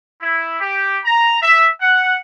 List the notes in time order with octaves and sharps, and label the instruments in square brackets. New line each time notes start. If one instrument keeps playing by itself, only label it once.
[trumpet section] E4
G4
A#5
E5
F#5